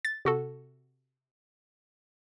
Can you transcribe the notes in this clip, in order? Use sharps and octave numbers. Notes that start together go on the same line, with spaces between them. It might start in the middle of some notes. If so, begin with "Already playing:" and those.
A6
C3 F#4 A4